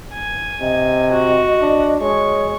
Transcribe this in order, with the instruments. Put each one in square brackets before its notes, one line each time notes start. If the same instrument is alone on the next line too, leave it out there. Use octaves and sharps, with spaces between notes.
[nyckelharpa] G#5
[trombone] C3 [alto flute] D#5
[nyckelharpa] F#4
[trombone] D4
[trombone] G#3 [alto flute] C#5 [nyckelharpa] C#6